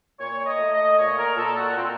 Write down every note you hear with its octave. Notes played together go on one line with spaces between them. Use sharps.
A#2 C#5
D#5
A3
D#5
A#2 C#5
A#4
A#2 A4
F#4
A#2 C4